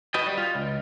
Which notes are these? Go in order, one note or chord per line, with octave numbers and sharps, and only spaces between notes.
F#4 B4 D#5 G5
G3
F4
C#2